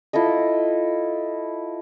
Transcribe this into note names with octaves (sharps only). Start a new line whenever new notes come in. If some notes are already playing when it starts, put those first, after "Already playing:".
E4 F4 A4 D#5